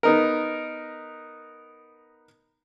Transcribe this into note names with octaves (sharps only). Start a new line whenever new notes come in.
B3 D#4 A#4